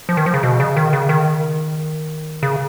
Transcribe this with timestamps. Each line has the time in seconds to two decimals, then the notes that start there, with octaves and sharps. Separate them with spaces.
0.09 F3
0.17 D#3
0.26 F3
0.34 C#3
0.43 B2
0.60 C#3
0.77 D#3
0.93 C#3
1.09 D#3
2.43 C#3